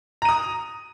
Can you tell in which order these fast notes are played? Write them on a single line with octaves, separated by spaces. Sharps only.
A#5 D#7 D#6